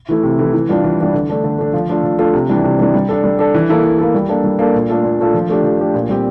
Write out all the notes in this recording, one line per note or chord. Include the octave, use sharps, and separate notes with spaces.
E3 A3 E4
C3
E3 A3 E4
E3
G3 D4 F4
E3
G3 D4 F4
D3
A3 D4
D3
A3 D4
F3
A3 D4 F4 A4
F3
A3 D4 F4 A4
C3
E3 G3 D4
C3
E3 G3 D4
G3
D4 A4
G3
D4 A4
E3
A#3 E4 A4
E3
A#3 E4 A4
G3
A#3 D4 A4
G3
A#3 D4 A4
A#2
A3 D4 F4 A4
A#2
A3 D4 F4 A4
F3
A3 D4 G4
F3
A3 D4 G4
A#2
G3 C4 G4